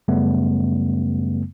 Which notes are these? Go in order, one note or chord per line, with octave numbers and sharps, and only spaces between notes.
F#2 C#3 G3 A3 B3